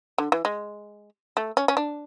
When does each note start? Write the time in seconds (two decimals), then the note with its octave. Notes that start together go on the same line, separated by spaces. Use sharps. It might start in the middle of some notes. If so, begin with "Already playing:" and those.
0.18 D3
0.32 E3
0.45 G#3
1.37 A3
1.57 C#4
1.68 C#4
1.77 D4